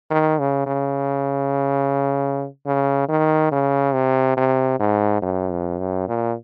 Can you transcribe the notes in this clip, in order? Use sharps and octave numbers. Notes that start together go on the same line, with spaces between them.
D#3
C#3
C#3
C#3
D#3
C#3
C3
C3
G#2
F#2
F2
F#2
A#2